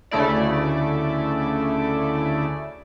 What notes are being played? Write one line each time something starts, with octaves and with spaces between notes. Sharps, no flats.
D2 C#3 A3 E4 D5